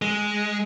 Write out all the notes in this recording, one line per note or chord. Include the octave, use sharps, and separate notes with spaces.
G#3